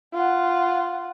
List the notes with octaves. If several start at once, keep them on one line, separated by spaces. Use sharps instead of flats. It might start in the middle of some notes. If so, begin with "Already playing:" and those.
F4 F#5